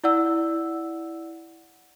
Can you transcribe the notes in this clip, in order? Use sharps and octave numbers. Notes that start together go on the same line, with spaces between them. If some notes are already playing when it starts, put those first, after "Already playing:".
E4 D5 F#5 E6